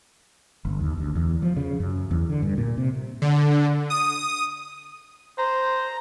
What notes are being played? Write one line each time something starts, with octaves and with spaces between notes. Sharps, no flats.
G1
D#2
D2
E2
F3
C#3
F#2
E2
D3
G2
A#2
C3
D3
D#6
C5 A#5